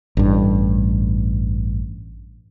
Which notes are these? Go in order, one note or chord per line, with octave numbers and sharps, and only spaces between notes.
A1 G2